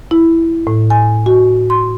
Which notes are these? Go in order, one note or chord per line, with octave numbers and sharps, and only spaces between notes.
E4
A2
G#5
F#4
C6